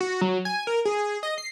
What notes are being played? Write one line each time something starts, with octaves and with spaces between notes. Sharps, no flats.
F#4
F#3
G#5
A#4
G#4
D#5
C7